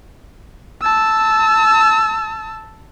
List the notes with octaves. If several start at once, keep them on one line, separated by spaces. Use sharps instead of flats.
A5 E6